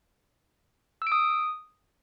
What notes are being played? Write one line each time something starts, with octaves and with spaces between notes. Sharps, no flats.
E6
D7
D#6